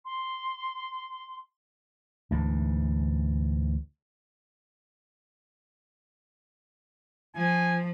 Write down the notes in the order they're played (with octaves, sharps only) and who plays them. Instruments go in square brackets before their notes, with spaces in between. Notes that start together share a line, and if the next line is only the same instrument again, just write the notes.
[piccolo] C6
[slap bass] D2 G#2 E3
[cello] F3 [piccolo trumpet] G#5